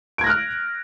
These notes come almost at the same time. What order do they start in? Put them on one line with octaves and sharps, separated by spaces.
D7 G#6 A#6 F#6 F6